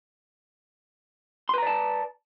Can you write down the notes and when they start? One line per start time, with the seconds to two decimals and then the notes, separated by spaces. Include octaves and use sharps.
1.49 C6
1.54 B4
1.58 A#5
1.62 D5
1.67 A5